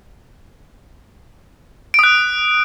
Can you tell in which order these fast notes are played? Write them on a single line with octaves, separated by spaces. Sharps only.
D7 D#6 F#6